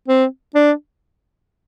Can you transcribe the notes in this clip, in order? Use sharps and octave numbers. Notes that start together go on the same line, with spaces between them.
C4
D4